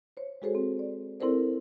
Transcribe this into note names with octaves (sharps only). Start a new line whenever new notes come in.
C5 C#5
G#3 F#4 G#4 A4 C5 C#5
C4
D5
C4 E4 A4 A#4 C5 D5